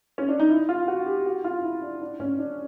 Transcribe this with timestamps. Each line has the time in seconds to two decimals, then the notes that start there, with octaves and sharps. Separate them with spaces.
0.18 C#4
0.29 D4
0.40 D#4
0.50 E4
0.69 F4
0.88 F#4
1.06 G4
1.26 F#4
1.44 F4
1.63 E4
1.82 D4
2.01 D4
2.20 C#4
2.39 D4